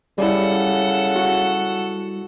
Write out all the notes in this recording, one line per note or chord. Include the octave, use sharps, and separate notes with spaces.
C#3 G3 E4 A4 F#5
F#4